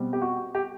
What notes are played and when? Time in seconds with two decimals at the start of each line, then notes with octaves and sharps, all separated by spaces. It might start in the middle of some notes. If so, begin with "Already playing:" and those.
Already playing: B2 G3 C4
0.13 G4
0.22 F#4
0.55 G4